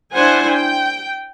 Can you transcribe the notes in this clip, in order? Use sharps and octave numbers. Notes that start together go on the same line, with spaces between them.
D4 E4 C5 F#5 G#5
G5